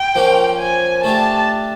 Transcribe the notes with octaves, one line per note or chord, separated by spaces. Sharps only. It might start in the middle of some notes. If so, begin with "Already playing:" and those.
Already playing: G5
F3 A#3 C#4
G#5
A3 D4 G4 A5